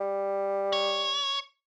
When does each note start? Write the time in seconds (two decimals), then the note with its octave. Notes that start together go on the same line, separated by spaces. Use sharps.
0.01 G3
0.73 C#5